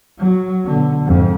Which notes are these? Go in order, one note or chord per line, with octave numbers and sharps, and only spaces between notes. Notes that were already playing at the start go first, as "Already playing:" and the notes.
F#3
B2 D3
F2 G#2